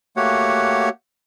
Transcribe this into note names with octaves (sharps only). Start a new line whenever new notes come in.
A3 A#3 F#4 G4 C#5 F#5